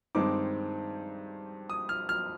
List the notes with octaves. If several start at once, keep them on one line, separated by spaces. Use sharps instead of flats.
G2 D#3 G#3 C4 D#4 D6
D#6
F6
F6